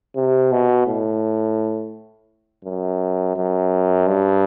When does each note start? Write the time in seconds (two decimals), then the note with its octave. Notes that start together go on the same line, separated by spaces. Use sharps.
0.16 C3
0.52 B2
0.87 A2
2.65 F#2
3.37 F#2
4.07 G2